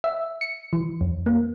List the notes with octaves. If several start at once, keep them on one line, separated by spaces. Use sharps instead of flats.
E5
C#7
E3
F2
A#3